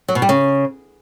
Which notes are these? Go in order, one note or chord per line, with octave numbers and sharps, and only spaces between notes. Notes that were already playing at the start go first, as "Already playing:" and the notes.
F#3
B2
G3
C#3